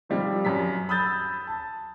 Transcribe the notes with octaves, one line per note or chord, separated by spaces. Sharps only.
D#3 F3 G3 C4
F#2 B6
B5 D#6 E6 G6 A6
A5